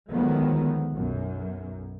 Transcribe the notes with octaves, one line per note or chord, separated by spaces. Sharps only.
D2 D#3 F3 F#3 G#3 B3
B1 F#2